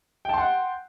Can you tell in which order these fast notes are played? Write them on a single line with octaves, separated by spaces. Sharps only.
G5 A5 C6 F#5